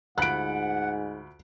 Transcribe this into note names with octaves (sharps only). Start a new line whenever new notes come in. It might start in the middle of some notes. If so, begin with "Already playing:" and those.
D2 G#2 F4 F#5 B5 F#6 D7